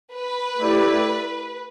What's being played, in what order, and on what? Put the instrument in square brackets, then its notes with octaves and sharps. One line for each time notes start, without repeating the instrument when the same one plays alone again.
[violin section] B4
[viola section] A3 E4 G4 D5